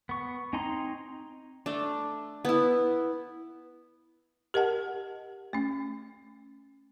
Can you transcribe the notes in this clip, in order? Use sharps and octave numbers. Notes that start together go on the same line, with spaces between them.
B3 C#6
C4 D#4 G#5 A#5 C6
A3 D4
B3 E4
G4 A#4 D#5 F#5 A5
A3 C#4